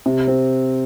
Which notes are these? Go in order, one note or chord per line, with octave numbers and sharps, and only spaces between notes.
C3
C4